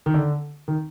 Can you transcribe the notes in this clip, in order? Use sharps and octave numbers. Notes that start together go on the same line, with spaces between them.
D#3
D3
D#3